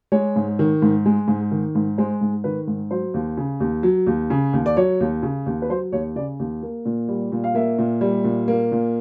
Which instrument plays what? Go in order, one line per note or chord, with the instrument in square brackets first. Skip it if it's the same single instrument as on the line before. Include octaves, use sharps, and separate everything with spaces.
[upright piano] G#3 C#5
G#2
D#3
G#2
G#3
G#2
D#3
G#2
G#3 C5
G#2
D#3 B4
G#2
F#3 C5
D#2
C#3
D#2
F#3
D#2
C#3
D#2
D5
F#3 C#5
D#2
C#3
D#2
B4
F#3 C5
D#2 C#5
C#3 D5
D#2
A#3
A#2
G3
A#2
F5
A#3 E5
A#2
G3
A#2
A#3
A#2